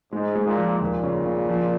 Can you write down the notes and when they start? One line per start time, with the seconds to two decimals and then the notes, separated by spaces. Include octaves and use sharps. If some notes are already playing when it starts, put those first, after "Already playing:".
0.12 G#2 G#3
0.35 G#3
0.46 A#2
0.57 F3
0.81 D#2 A#2
1.03 C#3
1.26 C#3
1.49 F3